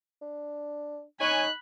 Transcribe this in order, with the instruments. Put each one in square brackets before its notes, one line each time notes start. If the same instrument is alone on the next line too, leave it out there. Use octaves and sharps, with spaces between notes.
[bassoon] D4
[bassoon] D#4 [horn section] C#5 G#5 [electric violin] B5 F#6